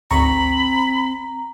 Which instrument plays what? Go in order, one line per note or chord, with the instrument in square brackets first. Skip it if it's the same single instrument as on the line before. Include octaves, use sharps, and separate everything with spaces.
[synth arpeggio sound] G#1 D2 C#6 [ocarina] C4 [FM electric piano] A#5 [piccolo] B5